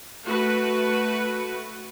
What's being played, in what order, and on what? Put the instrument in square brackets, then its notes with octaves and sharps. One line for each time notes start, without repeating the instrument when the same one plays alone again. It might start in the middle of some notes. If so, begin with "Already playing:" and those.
[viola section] A3 F#4 B4